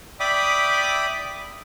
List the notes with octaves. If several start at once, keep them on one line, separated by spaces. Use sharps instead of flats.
D5 E5 G5 B5 D6 D#6